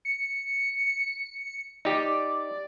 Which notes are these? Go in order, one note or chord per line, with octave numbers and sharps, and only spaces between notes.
C#7
D#4 G4 D5